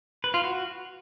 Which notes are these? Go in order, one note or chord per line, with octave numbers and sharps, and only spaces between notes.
B4
F4
F#4